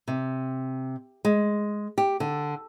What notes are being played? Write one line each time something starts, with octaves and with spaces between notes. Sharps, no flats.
C3
G#3
G4
D3